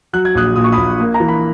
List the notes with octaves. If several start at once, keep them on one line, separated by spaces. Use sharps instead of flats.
F#3 F#6
G#6
A#1 D#6 F#6
A#2 D#6
C#6
A#1 B5 D#6
A#3
A#5
E3
B5